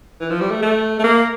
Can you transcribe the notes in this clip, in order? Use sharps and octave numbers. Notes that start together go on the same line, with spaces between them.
E3
F3
G3
A3
A3
A3
A#3